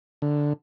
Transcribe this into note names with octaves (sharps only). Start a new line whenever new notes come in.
D3